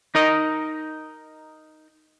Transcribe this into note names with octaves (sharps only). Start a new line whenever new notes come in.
D#4 A#4 D#5